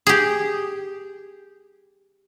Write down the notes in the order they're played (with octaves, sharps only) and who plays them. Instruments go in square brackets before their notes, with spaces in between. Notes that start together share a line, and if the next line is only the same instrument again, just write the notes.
[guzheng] G4 G#4